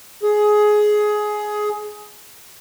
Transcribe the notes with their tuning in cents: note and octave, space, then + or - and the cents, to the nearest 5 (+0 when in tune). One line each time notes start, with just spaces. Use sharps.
G#4 +15